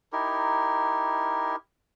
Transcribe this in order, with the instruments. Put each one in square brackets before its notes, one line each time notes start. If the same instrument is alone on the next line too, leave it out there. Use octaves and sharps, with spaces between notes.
[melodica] D#4 E4 G4 A#4